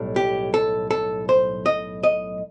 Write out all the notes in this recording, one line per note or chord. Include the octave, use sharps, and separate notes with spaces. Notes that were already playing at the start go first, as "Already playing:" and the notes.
Already playing: B1 A2 G3
G4
A4
A4
C5
D#5
D#5